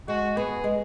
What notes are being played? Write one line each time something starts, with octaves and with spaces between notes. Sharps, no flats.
G#3 F#4
B3 G#4
G#3